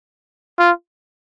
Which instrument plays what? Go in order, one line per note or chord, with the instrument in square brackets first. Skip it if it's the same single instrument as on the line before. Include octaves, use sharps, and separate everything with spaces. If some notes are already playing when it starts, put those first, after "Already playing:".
[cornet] F4